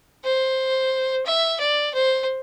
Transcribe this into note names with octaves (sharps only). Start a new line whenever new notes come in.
C5
E5
D5
C5